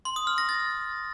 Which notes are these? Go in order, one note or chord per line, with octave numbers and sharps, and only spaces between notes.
C6
D#6
F6
A#6
A6